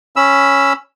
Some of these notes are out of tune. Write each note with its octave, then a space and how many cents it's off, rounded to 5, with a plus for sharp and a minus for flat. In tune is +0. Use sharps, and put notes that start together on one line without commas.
C#4 +0 B5 +0 E6 +0